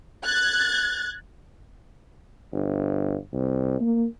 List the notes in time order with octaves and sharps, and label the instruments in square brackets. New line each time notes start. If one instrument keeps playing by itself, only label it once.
[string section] F#6 G#6 A6
[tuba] G1
C2
A#3